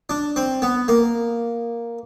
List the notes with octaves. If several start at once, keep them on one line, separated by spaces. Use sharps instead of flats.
D4
C4
B3
A#3